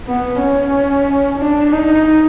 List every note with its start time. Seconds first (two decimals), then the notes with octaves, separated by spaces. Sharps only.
0.08 B3
0.41 C#4
1.39 D4
1.72 D#4